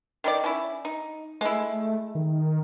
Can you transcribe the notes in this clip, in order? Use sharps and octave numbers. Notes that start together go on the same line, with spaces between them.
D#3 E4 D5
C#4 E4
D#4
G#3 A3 E4
D#3